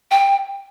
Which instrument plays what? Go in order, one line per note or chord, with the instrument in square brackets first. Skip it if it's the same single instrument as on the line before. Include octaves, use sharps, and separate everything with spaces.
[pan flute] G5